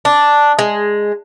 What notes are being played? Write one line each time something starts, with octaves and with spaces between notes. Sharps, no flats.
D4
G#3